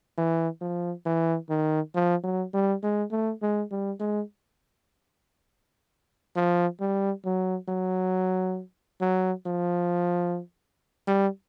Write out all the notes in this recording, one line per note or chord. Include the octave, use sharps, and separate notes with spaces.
E3
F3
E3
D#3
F3
F#3
G3
G#3
A3
G#3
G3
G#3
F3
G3
F#3
F#3
F#3
F3
G3